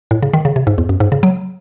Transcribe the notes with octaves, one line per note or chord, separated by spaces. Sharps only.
A2
C#3
D#3
C#3
C3
G#2
E2
F#2
G#2
C#3
F#3